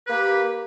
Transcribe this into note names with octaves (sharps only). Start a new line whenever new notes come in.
A#3 G4 B4